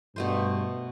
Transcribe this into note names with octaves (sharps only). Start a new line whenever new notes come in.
G2 B2 A3 C5